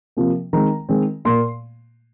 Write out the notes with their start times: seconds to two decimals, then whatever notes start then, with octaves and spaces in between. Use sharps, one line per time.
0.17 C3 F3 A#3
0.53 D#3 G#3 C4 A#5
0.89 D#3 G#3 C4
1.25 A#2 A#3 C6